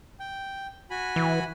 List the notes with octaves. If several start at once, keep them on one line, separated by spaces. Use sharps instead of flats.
G5
F#4 G#5 B5
E3